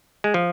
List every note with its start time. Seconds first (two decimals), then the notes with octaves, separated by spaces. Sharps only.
0.24 G#3
0.34 F3